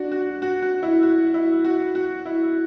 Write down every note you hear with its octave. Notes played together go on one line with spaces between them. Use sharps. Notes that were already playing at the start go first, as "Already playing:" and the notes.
Already playing: D4 F#4
F#4
F#4
F#4
E4
F#4
E4
F#4
F#4
E4